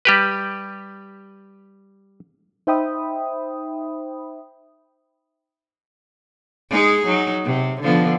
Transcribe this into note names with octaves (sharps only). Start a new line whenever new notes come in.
G3 G4 B4
D#4 C5 E5 G5 B5 D#6
G#3 D#4 G#4
F#3 D#4
C3
D3 F3 B3